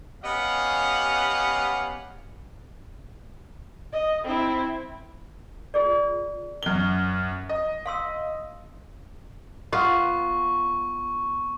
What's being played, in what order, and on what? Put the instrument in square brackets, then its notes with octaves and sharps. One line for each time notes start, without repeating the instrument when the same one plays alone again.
[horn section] B3 C#4 G4 D#5 F5 F#5
[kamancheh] D#5
C4 E4
[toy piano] F4 G#4 D5
[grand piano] F#2 G7
D#5
[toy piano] F5 C6 E6
[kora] B3 F4 [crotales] C#6